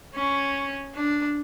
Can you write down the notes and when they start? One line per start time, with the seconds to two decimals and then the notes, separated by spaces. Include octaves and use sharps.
0.15 C#4
0.95 D4